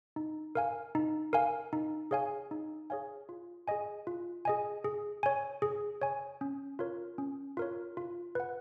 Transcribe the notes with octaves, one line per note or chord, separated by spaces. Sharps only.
D#4
A#4 F5 G#5
D#4
A#4 F5 G#5
D#4
G#4 C#5 F5 G#5
D#4
G#4 C#5 F5 G#5
F4
G#4 D#5 G#5
F4
G#4 D#5 G#5
G#4
C#5 G#5
G#4
C#5 G#5
C#4
F4 A#4 C#5
C#4
F4 A#4 C#5
F4
B4 F#5